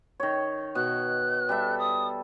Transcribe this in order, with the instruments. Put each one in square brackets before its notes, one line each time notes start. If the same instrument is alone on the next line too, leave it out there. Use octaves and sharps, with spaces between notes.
[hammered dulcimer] D#3 C#5
[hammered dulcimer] B2 [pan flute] F#6
[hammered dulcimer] G3 A4 E5
[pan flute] D#6